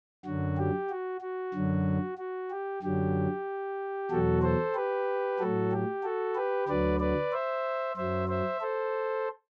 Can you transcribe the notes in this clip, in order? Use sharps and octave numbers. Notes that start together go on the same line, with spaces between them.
F#2 D3 F#3 F#4
G4
F#4
F#4
F#2 D3 F#3
F#4
G4
F#2 D3 F#3 G4
E2 B2 F#3 F#4 A4
A4 C5
G4 B4
A2 F#3 F#4 A4
G4
F#4 A4
G4 B4
D2 D3 F#3 B4 D5
B4 D5
C5 E5
F#2 F#3 C5 E5
C5 E5
A4 C5